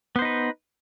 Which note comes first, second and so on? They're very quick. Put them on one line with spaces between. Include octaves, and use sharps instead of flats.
B3 C5 D#4 B4